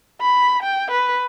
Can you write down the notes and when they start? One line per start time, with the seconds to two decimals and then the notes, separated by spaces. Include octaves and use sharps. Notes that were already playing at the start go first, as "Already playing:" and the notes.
0.21 B5
0.62 G5
0.91 B4